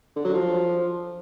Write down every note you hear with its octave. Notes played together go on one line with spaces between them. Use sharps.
D3
F#3
F3